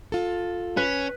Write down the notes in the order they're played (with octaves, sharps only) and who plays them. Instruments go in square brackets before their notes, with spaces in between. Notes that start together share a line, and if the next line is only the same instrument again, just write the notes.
[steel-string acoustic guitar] F4 A4
[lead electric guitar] C#4 [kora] B4